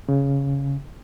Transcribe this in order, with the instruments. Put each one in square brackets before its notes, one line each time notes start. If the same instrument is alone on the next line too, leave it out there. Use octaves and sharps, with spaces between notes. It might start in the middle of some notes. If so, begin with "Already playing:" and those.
[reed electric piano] C#3